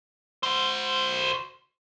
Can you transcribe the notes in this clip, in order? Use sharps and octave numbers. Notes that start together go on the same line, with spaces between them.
F#4 C5